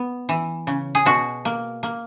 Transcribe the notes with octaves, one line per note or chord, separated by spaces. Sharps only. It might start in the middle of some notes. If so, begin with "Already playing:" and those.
Already playing: B3
E3
C#3
G#4
B2 F#4
A#3
A#3